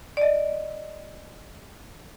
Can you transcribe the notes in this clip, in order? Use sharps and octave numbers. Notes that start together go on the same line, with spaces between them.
D5 D#5